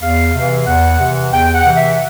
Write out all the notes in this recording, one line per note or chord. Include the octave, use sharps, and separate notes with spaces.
E2 F5
C3 E3
E2 F#5
C3 E3
E2 G5
F#5
C3 E3
E5